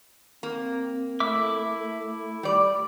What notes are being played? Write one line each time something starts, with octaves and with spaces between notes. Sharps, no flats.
A#3 C4
A3 E4 E5 D6
G3 D5